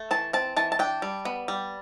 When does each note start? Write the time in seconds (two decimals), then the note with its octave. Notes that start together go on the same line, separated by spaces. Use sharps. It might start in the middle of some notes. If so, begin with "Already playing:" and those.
Already playing: A3
0.11 E3 A5
0.33 C4 A5
0.56 E3 A5
0.72 A5
0.79 D4 G5
1.02 G3
1.25 B3
1.48 G3